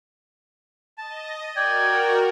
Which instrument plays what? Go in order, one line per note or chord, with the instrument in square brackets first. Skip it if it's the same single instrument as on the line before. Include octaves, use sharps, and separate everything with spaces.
[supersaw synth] D#5 [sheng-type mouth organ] A5
[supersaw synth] F#4 A#4 [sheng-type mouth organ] D5 G5 [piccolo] G#6